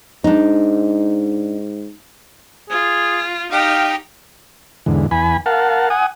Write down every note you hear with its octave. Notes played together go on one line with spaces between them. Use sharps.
G#2 D4 D#4
F4 G#4
D#4 G4 F5 G5
E2 G#2 D3
E2 G#5 B5
A#4 F5 F#5 A5
F#5 G#5 D#6